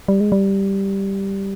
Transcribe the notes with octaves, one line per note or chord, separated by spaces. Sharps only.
G3
G#3
G3